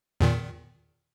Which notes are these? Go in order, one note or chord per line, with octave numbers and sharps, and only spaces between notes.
E2 A#2 D#3